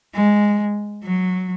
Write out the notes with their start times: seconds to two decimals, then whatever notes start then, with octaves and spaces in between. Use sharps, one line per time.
0.14 G#3
1.04 F#3